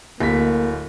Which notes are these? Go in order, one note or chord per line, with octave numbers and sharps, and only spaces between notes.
D1 A#3 B6